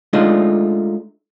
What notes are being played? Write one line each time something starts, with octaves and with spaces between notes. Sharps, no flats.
G#3 A3 D4 D#4 F4